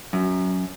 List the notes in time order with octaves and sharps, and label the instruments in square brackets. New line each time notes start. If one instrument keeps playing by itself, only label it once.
[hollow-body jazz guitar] F#2